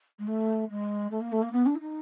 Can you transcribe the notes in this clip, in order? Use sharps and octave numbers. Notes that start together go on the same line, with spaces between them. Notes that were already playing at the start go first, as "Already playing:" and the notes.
G#3
A3
G#3
A3
A#3
A3
A#3
B3
D4
E4
D#4